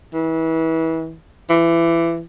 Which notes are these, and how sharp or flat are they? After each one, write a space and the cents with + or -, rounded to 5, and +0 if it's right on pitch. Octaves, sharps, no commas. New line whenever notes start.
E3 -30
E3 +25